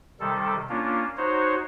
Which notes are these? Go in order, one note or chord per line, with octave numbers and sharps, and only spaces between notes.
C3 D#3 G3 A4
A#3 C#4 D4 F4
D#4 F#4 C5 C#5